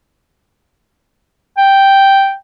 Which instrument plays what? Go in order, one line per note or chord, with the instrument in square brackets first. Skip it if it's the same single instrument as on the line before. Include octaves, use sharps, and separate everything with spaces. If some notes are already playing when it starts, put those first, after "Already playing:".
[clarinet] G5